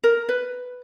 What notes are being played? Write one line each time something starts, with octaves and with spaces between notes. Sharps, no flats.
A#4
B4